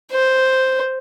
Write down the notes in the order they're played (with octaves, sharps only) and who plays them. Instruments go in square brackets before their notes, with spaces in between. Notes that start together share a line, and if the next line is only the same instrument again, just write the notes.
[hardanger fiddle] C5